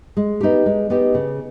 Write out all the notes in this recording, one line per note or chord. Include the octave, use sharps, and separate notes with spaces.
G#3
B3 D#4 G4
G#3
B3 D#4 G4
C#3